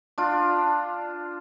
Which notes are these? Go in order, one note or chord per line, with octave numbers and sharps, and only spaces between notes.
D4 F4